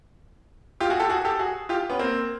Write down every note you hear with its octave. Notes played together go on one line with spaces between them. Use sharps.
F4 G4
F#4 G#4
G4 A4
F#4 G#4
G4 A4
F#4 G#4
F4 G4
B3 C#4
A#3 C4